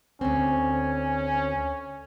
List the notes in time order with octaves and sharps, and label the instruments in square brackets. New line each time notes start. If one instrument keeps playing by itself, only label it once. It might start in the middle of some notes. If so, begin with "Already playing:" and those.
[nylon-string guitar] D2 C4 [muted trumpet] C#4